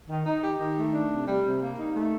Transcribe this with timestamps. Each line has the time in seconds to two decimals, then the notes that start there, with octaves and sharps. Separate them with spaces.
0.09 D#3
0.26 D#4
0.42 G4
0.59 D#3
0.76 A3
0.93 D4
1.10 C3
1.27 G3
1.44 C3
1.61 A#3
1.77 D#4
1.95 A3